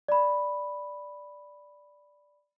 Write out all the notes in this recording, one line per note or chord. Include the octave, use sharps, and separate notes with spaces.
D5 B5